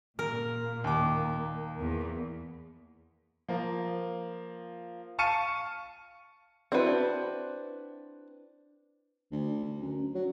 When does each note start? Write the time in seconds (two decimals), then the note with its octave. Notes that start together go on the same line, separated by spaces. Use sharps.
0.19 A#2 A#3 A#4
0.84 D#2 D6
1.78 E2
3.48 F3 A#3
5.19 F5 A5 C#6 F6 C#7 D#7
6.72 C4 D4 E4 F#4 B4
9.32 D2
9.65 D2
9.82 F#2
10.15 F#3